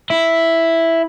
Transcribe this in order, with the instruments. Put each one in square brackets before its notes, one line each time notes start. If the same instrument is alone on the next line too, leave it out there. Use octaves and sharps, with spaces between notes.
[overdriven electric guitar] E4